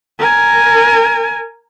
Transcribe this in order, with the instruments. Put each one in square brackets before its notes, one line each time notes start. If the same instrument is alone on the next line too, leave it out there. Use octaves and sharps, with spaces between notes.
[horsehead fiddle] A#4 G#5